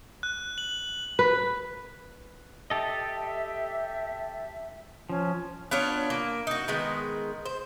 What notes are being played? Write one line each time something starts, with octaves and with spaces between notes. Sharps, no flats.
F#6
F#7
B4
G4 A4 D#5 E5
F3 C#4
B3 D4 F4 C#5
A#3
D#4 F#4
D#3 G#3 B3
C5